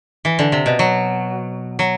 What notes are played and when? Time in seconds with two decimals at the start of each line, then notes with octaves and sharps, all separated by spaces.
0.25 E3
0.39 D3
0.52 C3
0.66 B2
0.79 F#3
1.79 F#3